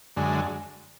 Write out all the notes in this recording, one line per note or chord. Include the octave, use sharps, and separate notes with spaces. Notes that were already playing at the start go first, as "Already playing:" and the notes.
F#2 D3 G#3